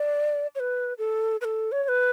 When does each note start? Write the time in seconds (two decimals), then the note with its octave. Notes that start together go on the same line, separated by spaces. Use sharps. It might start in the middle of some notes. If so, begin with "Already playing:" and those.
Already playing: D5
0.55 C#5
0.60 B4
0.98 A4
1.41 B4
1.44 A4
1.72 C#5
1.83 C#5
1.88 B4